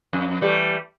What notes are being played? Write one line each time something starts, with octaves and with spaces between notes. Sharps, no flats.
F2
E3 G3 A3